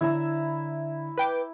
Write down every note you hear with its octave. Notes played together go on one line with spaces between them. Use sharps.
D3 E4 E5 A#5
B4 G5 D6